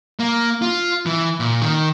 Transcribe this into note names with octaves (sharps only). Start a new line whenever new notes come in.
A#3
F4
E3
A#2
D#3